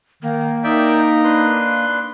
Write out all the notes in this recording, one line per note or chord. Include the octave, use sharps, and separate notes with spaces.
D#3 A#3
D#4 D5 E5 G5
D4 B4 C6